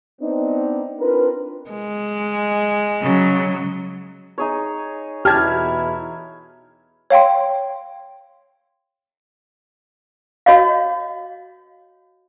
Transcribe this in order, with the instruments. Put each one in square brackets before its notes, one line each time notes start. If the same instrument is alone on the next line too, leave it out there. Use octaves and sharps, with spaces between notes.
[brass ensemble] B3 C4 D4 D#4
C4 D4 F4 A#4 B4
[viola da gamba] G#3
[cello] C#3 F#3
[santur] D#4 G#4 C#5
[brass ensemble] E2 B2 E4 [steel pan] G4 G5 A5 [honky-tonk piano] F6 G#6
[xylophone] C#5 F5 G5 C6
[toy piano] F#4 C#5 D#5 F5